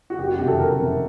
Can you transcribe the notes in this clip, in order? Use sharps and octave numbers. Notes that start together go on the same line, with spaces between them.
F#4
F#1 G4
F#4
F2 C3 D#3 G4
A4
F#1 A#4
F2 C3 D#3